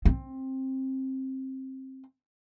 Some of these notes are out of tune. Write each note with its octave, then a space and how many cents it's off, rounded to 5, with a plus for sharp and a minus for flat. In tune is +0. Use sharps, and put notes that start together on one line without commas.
C4 +15